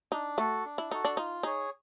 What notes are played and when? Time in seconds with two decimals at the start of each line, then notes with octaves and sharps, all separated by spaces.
0.12 D4 D#4
0.38 A3 F#4 A4
0.65 D4
0.78 E4
0.91 D#4 F#4 A4
1.05 D4
1.17 D#4 F4
1.43 D#4 G#4 C#5